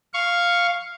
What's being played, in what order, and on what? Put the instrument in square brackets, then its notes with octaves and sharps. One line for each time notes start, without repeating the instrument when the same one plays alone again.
[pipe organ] F5 C#6